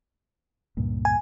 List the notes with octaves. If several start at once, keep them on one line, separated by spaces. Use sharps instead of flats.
C#2 G2 A#2
G#5